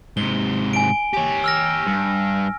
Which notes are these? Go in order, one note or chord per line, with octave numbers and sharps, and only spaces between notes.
G#2 C3 G7
G#5 D7
G4 C#5 G#5
E6 F6 A#6
G2